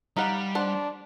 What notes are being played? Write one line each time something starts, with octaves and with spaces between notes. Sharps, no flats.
G3 D#4 F5 F#5
D4 C5 F#5 A5